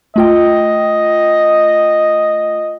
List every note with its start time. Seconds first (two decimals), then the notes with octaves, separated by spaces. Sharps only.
0.16 A3 F4 D#5 G5